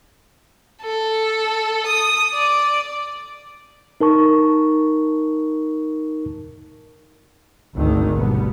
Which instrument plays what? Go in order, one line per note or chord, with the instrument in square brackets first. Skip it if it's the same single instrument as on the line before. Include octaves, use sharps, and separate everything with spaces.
[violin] A4
D#6
D5
[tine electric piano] D#4 A#4 A5 C#6
[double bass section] G#1 D2 D#3 G#3
G#1 B2 G3 B3